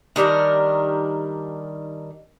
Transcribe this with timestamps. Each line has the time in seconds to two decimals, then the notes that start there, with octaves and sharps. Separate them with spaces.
0.16 D#3 G3 D4 A#4